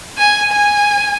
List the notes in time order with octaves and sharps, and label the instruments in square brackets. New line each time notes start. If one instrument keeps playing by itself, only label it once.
[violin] G#5
G#5